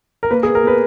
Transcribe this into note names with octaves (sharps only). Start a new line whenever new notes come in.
A#4
A#3 B4
G#4
A#3
A#4
B2 B4